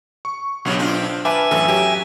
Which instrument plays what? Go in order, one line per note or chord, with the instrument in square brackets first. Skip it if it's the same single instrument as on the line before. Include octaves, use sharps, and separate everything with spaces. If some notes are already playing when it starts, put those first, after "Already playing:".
[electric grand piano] C#6
[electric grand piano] B1 [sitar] G2 C#3 F#3
[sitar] C4 D4 F4
[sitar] B4 [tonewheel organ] E5 G#5 [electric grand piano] F5 A5 D6
[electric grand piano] A1 F#2 [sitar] A4
[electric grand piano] F#3 [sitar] G4